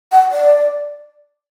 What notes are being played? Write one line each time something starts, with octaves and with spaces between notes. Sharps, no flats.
F#5
D5